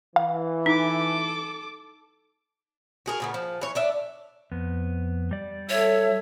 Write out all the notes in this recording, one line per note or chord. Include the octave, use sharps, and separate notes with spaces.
E3 F5
D#4 A4 D6
F#4 G#4 A#4
A#2 C#3 B3
F3
E3 C#5
D4 D5 E5
F2 B3
G3 D5
A4 C#5 E5